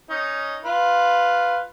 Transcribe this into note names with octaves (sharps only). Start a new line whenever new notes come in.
C#4 D#4
F4 B4